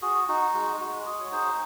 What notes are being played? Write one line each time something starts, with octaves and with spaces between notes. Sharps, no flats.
F#4 G#4
D#4 F#4
G#3 F#4
G#3 F#4
F#4 G#4
C#5
D#4 G#4 C5